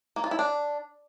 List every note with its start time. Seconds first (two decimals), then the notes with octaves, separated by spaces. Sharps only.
0.16 A#3
0.24 F4
0.31 E4
0.39 D4